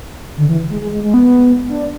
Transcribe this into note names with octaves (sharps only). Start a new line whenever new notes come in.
D3
E3
G#3
G#3
G#3
G#3
B3
D4